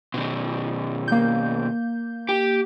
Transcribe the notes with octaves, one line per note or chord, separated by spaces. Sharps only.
B2 D#3
A#3 G6
G4